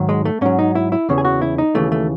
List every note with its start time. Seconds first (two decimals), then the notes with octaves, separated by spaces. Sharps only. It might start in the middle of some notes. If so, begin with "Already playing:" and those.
Already playing: G#2 D#3 F#3
0.09 G#3
0.25 A3
0.41 G#2 F#3 C#4
0.59 D#4
0.75 E4
0.92 E4
1.09 E2 C#3 E3
1.18 G#4
1.25 F#4
1.42 E4
1.58 D#4
1.75 D#2 C#3 E3 A3
1.92 A3